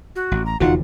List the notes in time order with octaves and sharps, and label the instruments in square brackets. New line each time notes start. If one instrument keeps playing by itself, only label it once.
[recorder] F#4
[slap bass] A1
[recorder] A#5
[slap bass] F1 E2 D3 [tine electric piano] D#4 F4 F#4 [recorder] F#5